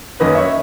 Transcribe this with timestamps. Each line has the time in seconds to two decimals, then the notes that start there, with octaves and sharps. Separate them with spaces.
0.20 F#2 D#3 A#3 C#4 B4 D#5
0.34 C#5 E5